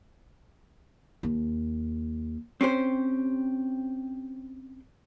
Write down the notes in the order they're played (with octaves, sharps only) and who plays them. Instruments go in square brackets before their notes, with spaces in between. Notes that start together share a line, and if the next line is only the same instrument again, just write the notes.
[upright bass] D#2
[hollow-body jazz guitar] C4 C#4 G4 C5